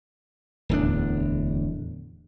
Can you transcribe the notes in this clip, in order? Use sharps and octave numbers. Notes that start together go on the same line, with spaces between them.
D1 E2 D4